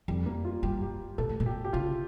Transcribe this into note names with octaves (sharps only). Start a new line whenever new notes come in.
F2 G3
A#3
F4
G2 G4
G4
A#2 A4
A2
A#2
G4
G4
C#3 F4